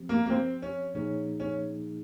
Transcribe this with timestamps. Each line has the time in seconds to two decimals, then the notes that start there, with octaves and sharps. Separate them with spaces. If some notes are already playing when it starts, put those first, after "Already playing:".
Already playing: F3 C4 G4
0.09 A#3
0.26 A#3
0.30 C4
0.62 C#4
0.94 A#2 F3 A#3 C#4 D#4 G#4
1.40 C#4